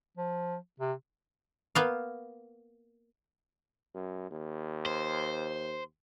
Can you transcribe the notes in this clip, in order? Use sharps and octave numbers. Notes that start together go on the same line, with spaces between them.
F3
C3
A#3 B3 F5
F#2
D#2
C5